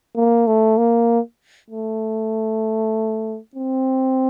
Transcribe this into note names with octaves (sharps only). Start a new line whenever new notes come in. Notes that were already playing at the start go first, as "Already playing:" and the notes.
A#3
A3
A#3
A3
C4